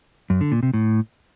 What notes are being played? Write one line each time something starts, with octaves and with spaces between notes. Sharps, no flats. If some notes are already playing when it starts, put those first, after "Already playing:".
F#2
D3
A#2
C3
A2